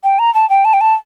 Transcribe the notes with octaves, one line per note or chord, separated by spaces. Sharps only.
G5
A#5
A5
G5
A5
G5
A5